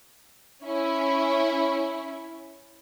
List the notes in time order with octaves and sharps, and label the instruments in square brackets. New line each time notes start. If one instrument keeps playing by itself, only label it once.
[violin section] C#4 E4